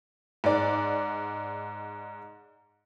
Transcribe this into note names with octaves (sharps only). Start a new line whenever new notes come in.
G#2 D5